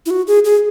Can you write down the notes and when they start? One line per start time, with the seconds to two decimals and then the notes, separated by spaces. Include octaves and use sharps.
0.06 E4
0.10 F#4
0.27 G#4
0.45 G#4